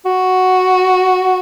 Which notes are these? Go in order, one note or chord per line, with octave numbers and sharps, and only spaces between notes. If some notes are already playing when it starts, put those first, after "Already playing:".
F#4